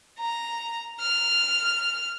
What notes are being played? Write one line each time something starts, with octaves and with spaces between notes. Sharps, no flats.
A#5
F6